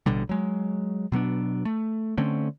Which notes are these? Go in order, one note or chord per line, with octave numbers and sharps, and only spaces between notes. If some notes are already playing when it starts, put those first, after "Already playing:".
A1 B2 D3 G3
F#3 G#3
B2 F#3 B3 D4
A3
D3 A3 C4 C#4